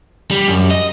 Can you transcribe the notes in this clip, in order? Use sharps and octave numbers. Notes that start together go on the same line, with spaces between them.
G3
F#2
D#5